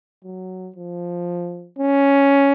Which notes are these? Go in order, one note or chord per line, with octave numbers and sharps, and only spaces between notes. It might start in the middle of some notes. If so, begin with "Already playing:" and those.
F#3
F3
C#4